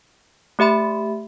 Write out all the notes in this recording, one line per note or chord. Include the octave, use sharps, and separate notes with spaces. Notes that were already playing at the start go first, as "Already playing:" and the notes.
A3 G4 E5 B5